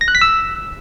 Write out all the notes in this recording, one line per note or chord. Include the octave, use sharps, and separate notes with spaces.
A#6
F#6
B6
E6